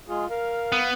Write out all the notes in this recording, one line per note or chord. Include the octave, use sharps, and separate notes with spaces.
G#3 F4 G#4
A#4 F5
B3